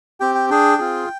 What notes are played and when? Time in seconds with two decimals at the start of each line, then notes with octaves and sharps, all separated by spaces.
0.20 C4 G4 G5
0.35 G5
0.50 D4 G#4 G5
0.78 C4 F4 G#4